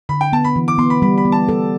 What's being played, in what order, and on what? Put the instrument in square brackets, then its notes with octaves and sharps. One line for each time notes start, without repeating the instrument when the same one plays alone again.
[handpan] D3 [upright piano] B5
[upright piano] G5
[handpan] B3 [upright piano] A5
[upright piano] B5
[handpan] E3
[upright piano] D6
[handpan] B3 [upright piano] C6
[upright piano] B5
[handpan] G3 [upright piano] B5
[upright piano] B5
[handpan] B3
[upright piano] A5
[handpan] A4